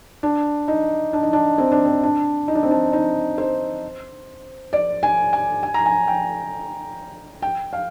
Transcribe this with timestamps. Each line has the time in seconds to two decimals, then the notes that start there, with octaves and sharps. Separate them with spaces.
0.23 D4
0.68 D#4
1.13 D4
1.23 D#4
1.33 D4
1.58 C4
1.72 D4
1.85 C4
2.03 D4
2.48 D#4
2.55 D4
2.63 C4
2.71 D4
2.93 D#4
3.38 C5
4.73 D5
5.03 G#5
5.33 G#5
5.63 G#5
5.74 A#5
5.86 G#5
6.08 G5
7.42 G5
7.73 F5